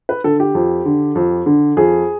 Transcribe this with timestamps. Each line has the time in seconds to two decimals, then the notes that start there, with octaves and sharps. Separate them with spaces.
0.09 B4
0.24 D3 A4
0.40 G4
0.55 F2
0.85 D3
1.15 F2
1.46 D3
1.77 F2 G#4